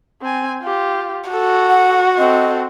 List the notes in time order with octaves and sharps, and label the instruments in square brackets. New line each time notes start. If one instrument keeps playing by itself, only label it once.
[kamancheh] C4 G#5
F4 G4
[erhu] F#4 [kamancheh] A4
[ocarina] F#5
[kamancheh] C4 A4 [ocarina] D#5